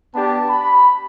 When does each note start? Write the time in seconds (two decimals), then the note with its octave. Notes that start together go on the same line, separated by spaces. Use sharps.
0.14 B3 D4 G4 A5
0.50 B5